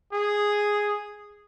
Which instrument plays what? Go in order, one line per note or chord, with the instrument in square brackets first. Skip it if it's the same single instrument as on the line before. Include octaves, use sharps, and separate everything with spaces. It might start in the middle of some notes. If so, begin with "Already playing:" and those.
[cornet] G#4